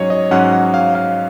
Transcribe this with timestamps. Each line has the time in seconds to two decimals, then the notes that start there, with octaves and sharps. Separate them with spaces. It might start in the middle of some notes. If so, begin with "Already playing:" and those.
Already playing: G#2 F#3 C#4 C#5 D#5
0.10 D#5
0.31 G#2 F#3 C#4 F#5
0.52 F#5
0.74 F5
0.95 F5